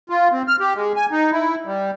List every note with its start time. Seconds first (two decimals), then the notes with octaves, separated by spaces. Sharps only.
0.10 F4
0.32 C4
0.48 F6
0.60 G4
0.75 G#3
0.96 G#5
1.11 D#4
1.32 E4
1.66 G3